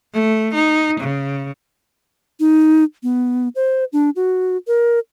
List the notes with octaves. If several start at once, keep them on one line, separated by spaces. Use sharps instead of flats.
A3
D#4
C#3
D#4
B3
C5
D4
F#4
A#4